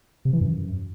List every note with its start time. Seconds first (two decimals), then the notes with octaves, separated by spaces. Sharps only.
0.25 C3
0.33 E3
0.41 F#2